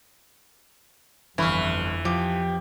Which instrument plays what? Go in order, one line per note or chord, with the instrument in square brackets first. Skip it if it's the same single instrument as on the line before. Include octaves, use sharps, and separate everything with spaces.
[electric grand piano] G1 B5 C#6 [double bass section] F2 [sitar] E3 [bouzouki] E4 F5
[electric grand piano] F3 [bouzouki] G4